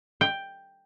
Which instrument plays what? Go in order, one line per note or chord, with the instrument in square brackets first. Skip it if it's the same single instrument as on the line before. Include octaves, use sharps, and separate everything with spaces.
[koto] G5